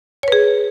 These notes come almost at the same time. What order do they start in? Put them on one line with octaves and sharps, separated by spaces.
C#5 B4 G#4